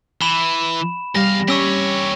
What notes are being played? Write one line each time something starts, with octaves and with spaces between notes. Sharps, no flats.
E3 B5 E7
E2 G3 F5 A#6
C#4 G4 C#5 C#6 E6 B6